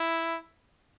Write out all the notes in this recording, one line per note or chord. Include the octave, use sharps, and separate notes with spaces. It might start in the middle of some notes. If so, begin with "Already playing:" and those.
Already playing: E4